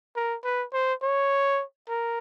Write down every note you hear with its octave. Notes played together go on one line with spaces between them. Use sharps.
A#4
B4
C5
C#5
A#4